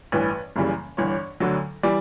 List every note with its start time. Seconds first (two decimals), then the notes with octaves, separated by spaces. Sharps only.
0.12 A1 G2 E3 B4
0.56 F#1 F#2 C#3 E3 G3
0.97 G1 G2 E3 C#5
1.40 D2 D3 F#3
1.83 E3 G3 D5